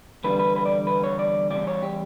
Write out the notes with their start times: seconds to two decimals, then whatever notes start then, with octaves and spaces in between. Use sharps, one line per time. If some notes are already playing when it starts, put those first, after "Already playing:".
0.24 E2 D3 G3 B4
0.39 B4
0.56 B4
0.66 D5
0.87 B4
1.04 C#5
1.19 D5
1.50 E2 C#3 E3 G3 D5
1.67 C#5
1.82 G4